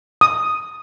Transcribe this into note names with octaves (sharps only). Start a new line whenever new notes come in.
D#6